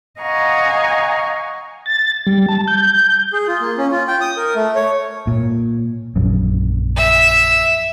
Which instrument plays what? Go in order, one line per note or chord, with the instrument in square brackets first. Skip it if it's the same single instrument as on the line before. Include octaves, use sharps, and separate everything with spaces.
[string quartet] D#5 F5 F#5 G#5 A#5 C#6
[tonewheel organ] A6
G3
A5
G6
[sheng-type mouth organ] G#4
F4
A#3
C#4
F4
G5
D#6
A#4
A3
C#5
[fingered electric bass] A#2
A#1 F#2
[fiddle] E5